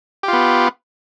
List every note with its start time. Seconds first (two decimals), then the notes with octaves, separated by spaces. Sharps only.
0.23 G4
0.28 F4
0.33 B3